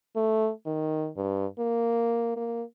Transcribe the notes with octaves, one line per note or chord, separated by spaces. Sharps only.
A3
D#3
G2
A#3
A#3